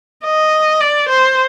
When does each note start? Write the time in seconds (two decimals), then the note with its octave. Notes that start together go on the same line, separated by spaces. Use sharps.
0.24 D#5
0.80 D5
1.09 C5